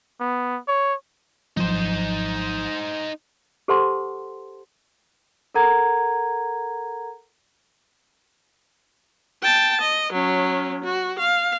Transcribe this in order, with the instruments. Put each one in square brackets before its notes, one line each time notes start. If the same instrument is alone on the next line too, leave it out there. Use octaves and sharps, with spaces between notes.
[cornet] B3
C#5
[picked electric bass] G#1 F3 F#3 [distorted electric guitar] D#4 C5
[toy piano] G4 A4 C5 F#5 A5 C6
[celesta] A4 A#4 F#5 A#5 G#6
[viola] G5 A5
D#5
F#3 C#4
F#4
F5